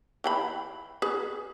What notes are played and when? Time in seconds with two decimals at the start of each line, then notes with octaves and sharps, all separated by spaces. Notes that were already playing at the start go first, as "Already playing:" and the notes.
0.24 E3 G5 B5
1.02 G#4 B4